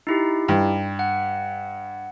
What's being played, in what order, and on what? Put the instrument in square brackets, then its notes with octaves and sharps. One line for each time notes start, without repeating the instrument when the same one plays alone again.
[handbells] D#4 E4 G4
[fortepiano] G2
[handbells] F#5